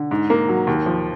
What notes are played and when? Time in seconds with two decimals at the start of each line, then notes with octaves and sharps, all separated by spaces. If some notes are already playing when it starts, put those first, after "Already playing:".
Already playing: D3
0.11 G#2
0.30 A#3
0.48 F#3
0.67 D#2
0.86 F3